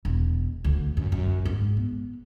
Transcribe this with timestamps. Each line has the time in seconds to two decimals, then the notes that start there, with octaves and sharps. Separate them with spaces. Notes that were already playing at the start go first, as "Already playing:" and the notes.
0.05 E1
0.64 D2
0.97 F#2
1.12 F#2
1.45 G#2
1.77 B3